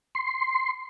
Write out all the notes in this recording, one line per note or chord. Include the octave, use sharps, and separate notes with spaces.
C6